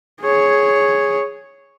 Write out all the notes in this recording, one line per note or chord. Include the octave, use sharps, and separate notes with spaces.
G#4 C#5